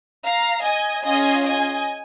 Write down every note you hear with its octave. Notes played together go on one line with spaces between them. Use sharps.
F5 A#5
D#5 G#5
C#4 F4 G#4 D#5 G#5
D#5 G#5